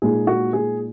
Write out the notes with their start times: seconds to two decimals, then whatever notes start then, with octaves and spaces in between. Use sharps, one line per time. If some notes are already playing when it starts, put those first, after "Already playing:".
0.02 A#2 G#3 D#4 G#4
0.27 F#4
0.53 G#4